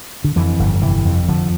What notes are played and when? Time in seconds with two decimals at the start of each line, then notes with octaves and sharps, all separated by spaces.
0.24 D3
0.36 F2 E3
0.59 G1
0.81 C3 E3
1.05 F2
1.28 D3 F3